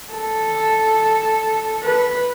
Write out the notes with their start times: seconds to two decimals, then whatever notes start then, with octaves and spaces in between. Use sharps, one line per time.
0.13 A4
1.84 B4